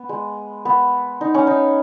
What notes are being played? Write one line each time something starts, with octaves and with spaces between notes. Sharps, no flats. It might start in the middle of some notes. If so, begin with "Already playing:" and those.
Already playing: B3
G#3
B3
D#4
C#4
D#4